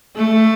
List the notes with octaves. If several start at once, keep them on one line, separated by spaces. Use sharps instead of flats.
A3